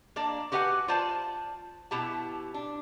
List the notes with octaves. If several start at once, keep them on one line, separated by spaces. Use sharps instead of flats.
A#3 D4 D5 A5
F#4 G4 B4 E5 F#5 G#5
F4 C5 D5 A5
B2 E4 G4 A5
D4